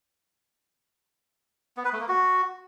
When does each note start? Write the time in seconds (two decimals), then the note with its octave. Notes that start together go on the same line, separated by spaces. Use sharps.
1.77 B3
1.85 B4
1.93 A3
2.01 A#3
2.08 F#4